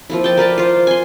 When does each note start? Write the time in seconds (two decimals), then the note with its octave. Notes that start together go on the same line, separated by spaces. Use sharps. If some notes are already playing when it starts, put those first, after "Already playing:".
0.10 F3 A#3 E4
0.24 G5 A5
0.37 A#4 B4 D5 A5
0.58 F4 C5
0.87 G#5 C6